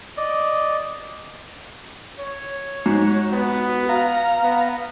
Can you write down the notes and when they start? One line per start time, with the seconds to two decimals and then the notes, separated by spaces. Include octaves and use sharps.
0.17 D5 D#5
2.20 C#5
2.86 G#2 F#4
3.32 B3
3.89 F5 A#5
4.44 B3